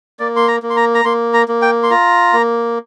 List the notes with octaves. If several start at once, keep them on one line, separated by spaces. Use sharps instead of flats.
A#3 D5
C6
A#5
A#3
C6
A#5
A#5
A#3 C6
A#5
A#3
G5
C6
F4 A#5
A#3